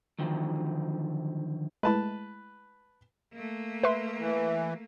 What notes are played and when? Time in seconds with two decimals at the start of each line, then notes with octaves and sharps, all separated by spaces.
0.19 D3 D#3 F3 F#3
1.83 G#3 A3 E4 B4 A5
3.33 A3 A#3
3.83 B4 E5 C6
4.19 E3